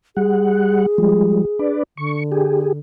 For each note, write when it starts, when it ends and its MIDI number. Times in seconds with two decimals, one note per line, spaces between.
0.17 0.86 55
0.17 1.74 68
0.17 0.86 78
0.98 1.45 53
0.98 1.45 55
0.98 1.45 56
1.59 1.83 62
1.59 1.83 71
1.59 1.83 74
1.97 2.78 50
1.97 2.23 85
2.32 2.72 67
2.32 2.72 68